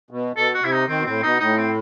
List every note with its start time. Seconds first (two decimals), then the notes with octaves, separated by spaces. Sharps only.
0.11 B2
0.36 B2 A4
0.54 F#4
0.62 C3 E4
0.71 D#4
0.88 D#3 C4
0.98 B2
1.06 A2 C4
1.23 B2 D#4
1.40 A2 D#4
1.57 C4